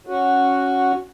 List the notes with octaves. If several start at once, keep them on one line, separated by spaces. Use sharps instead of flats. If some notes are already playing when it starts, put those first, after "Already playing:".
C#4 F#4